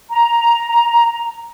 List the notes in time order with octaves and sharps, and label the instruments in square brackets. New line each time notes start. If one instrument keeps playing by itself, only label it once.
[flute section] A#5